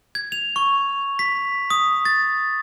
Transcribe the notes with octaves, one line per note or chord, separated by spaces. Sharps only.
G#6
F7
C#6
B6
D#6
A6